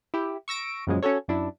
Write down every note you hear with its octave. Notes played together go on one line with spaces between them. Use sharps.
E4 G4
C#6 E6 A#6 D7
F#2 A#2 C#3 F3 F#3 G#3
C#4 F#4 A4 C#5
F#2 D4 E4